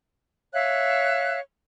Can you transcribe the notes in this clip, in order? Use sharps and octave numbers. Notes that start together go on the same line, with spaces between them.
C#5 E5 F5 F#6